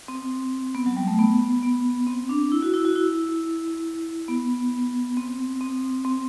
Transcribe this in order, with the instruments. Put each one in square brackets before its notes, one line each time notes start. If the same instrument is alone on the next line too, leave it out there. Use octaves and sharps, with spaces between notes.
[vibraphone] C4
B3
F#3
G3
A3
B3
B3
C4
D4
E4
F#4
E4
F#4
E4
B3
C4
C4
C4